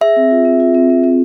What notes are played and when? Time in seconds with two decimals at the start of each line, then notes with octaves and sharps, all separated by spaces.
0.01 G#4 E5
0.16 C4
0.31 F4
0.45 C4
0.60 F4
0.74 C4
0.90 C4
1.04 C4